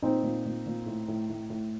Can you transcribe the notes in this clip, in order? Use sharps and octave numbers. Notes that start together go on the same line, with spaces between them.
A#2 C4 D#4
A#2
A#2
A#2
A2
A2
A2
A2